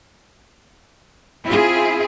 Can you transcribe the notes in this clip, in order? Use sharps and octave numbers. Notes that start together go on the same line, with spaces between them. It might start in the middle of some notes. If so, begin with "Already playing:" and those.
C4 E4 F4 G#4